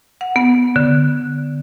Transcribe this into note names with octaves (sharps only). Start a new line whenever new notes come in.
F#5
B3
D3